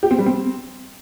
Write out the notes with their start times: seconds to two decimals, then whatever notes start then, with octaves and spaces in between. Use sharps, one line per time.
0.03 G4
0.11 C4
0.18 G3
0.26 C4